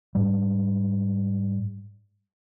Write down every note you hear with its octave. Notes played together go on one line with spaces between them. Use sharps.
G#2 G3